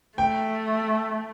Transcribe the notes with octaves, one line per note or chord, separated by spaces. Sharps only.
A3 G5